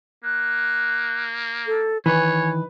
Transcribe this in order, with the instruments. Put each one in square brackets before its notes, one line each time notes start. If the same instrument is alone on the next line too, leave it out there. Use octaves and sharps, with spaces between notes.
[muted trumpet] A#3 [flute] F#6
[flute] A4
[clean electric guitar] D#3 E3 [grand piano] B4 [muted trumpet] C#5 [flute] G#5